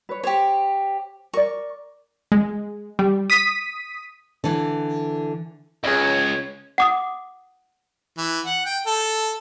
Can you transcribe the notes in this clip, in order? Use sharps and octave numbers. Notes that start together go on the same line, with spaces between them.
B4 C#5
G4 C5 C#5
A#4 D5 C#6
G#3
G3
D#6 B6 D#7
D3 E3
C#2 G#4 C#5 D#5
F#5 D6 D#6
E3
F#5
G5
A4